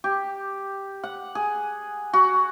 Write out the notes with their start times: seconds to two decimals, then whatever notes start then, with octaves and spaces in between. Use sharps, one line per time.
0.04 G4
1.04 F#5
1.35 G#4
2.13 F#4